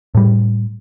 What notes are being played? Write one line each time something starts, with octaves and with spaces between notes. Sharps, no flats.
A2 G3